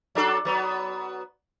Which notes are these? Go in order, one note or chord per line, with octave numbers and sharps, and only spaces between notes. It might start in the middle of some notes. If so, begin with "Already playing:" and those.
F#3 D4 A4
F#3 B3